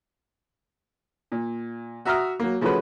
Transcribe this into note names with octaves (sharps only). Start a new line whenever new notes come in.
A#2
F#4 E5 A#5 D#6 F6
F#3 A#3
C#3 F3 A3 C#4 F#4 B4